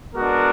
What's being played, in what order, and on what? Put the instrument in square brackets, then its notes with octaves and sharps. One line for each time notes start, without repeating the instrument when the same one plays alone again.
[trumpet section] G#3 B3 D4 F#4 A#4